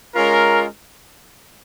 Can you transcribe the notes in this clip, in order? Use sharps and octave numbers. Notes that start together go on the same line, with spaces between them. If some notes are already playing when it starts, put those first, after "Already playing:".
G#3 C#4 F4 A#4